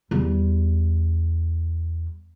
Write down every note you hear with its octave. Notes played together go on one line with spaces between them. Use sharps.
E2 G3